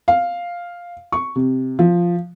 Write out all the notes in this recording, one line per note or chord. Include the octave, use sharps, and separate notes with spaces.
F5
C#6
C3
F3